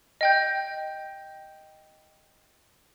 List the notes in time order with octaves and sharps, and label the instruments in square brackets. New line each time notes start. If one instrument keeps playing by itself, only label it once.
[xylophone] D#5 G5 G6